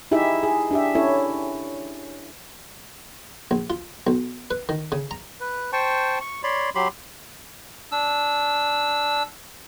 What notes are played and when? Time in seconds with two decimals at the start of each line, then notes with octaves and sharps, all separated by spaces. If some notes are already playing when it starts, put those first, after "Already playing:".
0.11 D#4 E4 G4 G#4 E5
0.43 G#4
0.71 D4 G4 E5
0.95 C#4 E4 A4 C#5
3.51 A#1
3.70 F4
4.07 B1
4.51 B4
4.69 D#3
4.92 C#3
5.11 A#5
5.40 B4
5.73 C5 G5 A5 C#6
6.21 C#6
6.43 C#5 D5 B5 C6
6.75 F#3 G4 B5 C6
7.92 D4 E6